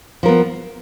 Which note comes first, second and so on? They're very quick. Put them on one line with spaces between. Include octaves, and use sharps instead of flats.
F3 A#4 B3